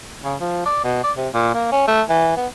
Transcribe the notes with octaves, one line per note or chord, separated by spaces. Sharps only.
C#3
F3
D5
B2
D5
C3
A#2
A#3
C#4
A3
E3
B3